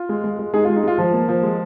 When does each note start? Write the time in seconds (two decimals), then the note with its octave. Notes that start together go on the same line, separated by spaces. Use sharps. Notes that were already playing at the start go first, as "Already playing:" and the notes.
Already playing: F4
0.09 G#3
0.24 G#3
0.39 G#3
0.53 G#3 D#4 G#4
0.65 F4
0.69 G#3
0.76 D#4
0.83 G#3 F4
0.98 F3
1.13 A#3
1.28 F3
1.43 G#3